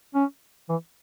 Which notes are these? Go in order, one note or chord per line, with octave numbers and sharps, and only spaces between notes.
C#4
E3